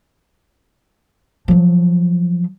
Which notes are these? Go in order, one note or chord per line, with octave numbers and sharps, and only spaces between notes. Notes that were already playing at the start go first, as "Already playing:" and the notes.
F3 F#3